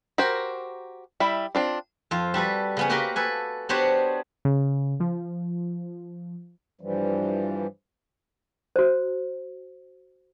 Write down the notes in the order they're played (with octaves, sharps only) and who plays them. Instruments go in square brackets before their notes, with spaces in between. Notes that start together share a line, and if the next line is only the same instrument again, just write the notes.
[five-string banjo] F#4 G4 A#4 C5
G3 E4 E5
C4 D4 F4
[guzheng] F2 F4
G3 F#4 A4 B4
C#3 B3 C#4
A#3 F#4 G4 A#4 B4 C6
A4 B4 G#5
B3 D4 F#4 G4 C5 C#5
[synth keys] C#3
F3
[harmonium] G2 E3 F3 G3
[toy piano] F#4 C5